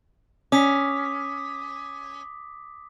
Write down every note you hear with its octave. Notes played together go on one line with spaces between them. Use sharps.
C#4 D6 D#6 B6